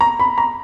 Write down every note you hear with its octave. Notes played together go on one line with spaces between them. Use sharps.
A#5
B5
A#5